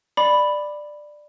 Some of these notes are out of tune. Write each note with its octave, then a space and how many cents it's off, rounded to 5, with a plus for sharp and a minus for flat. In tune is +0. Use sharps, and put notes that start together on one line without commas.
D5 +10 B5 +0 D6 +10